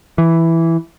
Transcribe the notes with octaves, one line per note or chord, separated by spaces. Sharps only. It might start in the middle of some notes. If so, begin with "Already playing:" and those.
E3